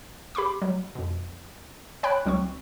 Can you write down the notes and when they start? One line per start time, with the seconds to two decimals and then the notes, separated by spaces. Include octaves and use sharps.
0.35 G4 B5 C6 D6
0.62 F#3
0.95 F2 B2
2.03 C#5 G5 B5 F#6
2.25 C#2 F#3 C4 C#6